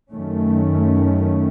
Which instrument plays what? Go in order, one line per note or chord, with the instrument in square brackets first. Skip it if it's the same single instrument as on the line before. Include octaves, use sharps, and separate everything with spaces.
[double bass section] F#2 D#3 A3 C#4